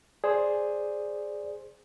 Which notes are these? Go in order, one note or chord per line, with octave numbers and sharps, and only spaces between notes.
G#4 C5 D5